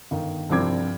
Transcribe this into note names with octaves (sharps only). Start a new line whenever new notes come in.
G1 D#3
C2 G2 F3 C4 D6 G#6